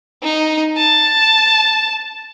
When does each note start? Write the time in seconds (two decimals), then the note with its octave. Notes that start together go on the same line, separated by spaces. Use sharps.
0.23 D#4
0.77 A5